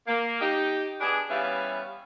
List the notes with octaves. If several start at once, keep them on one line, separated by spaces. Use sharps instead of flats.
A#3
D#4 G4
B3 D4 G#4
E3 G3 B3 C#4 E5 F5